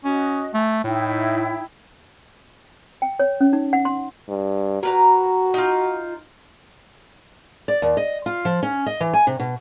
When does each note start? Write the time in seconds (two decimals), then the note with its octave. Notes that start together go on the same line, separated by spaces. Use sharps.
0.04 C#4 F#4 D#5 D#6
0.54 A3 G#5
0.84 A2 D#4 E4 G5
3.02 G5
3.19 C#5
3.41 C#4
3.53 D#4
3.73 F#5
3.85 C6
4.28 G2
4.83 A#3 F#4 B4 A#5
5.54 D#4 F4
7.68 D5
7.82 D#2
7.97 D#5
8.26 F4
8.45 F3
8.63 C#4
8.86 D#5
9.00 E3
9.13 G#5
9.27 C3
9.39 B2